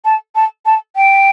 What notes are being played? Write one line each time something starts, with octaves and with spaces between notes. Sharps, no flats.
A5
A5
A5
G5